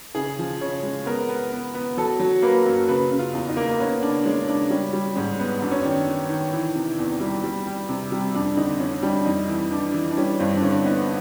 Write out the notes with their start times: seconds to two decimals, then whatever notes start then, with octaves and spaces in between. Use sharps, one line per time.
0.15 C#3 G#4
0.39 F3
0.61 C#3 C#5
0.83 G#3
1.06 B3 A#4
1.29 B3
1.52 B3
1.75 B3
1.97 F#3 A4
2.20 F#3
2.42 A#3 B4
2.66 F#2
2.88 C#3 B4
3.12 C#3
3.19 F4
3.34 E2
3.49 D#4
3.57 A#3
3.80 B3 C#4
4.02 C#3 D4
4.25 G#3 C#4
4.48 C#3 D4
4.70 G3 C#4
4.93 G3
5.15 G#2 C#4
5.39 B3
5.61 F#2 D4
5.71 C#4
5.80 D#3 D4
6.07 D#3
6.29 D#3
6.53 E3
6.75 C3
6.99 E2
7.20 G3
7.44 G3
7.67 G3
7.89 C3
8.12 G3
8.34 F2 D4
8.57 D3 D#4
8.80 F2 C#4
9.03 G3 D4
9.26 F2 D#4
9.48 E3
9.71 E3 D4
9.94 E3
10.11 D4
10.17 G3 C#4
10.39 G2 C4
10.55 D4
10.62 D3 C#4
10.85 B3 D#4